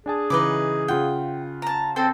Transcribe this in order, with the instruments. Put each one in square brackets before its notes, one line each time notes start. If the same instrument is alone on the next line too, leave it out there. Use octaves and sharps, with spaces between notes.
[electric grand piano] D4 G#5 A5 [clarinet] G#4
[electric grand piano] C#3 E3 [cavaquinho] D#4 B4 D6
[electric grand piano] C#3 F4 F#5 [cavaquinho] G5
[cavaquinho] A5 A#5
[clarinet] C4 [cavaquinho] A4 C5 G5